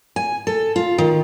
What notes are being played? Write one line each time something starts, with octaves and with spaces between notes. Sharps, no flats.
G#5
A4
F4
D#3